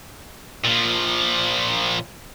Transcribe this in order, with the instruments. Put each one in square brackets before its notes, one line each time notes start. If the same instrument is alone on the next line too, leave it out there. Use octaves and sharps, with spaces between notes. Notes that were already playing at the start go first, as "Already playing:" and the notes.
[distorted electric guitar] A#2 F3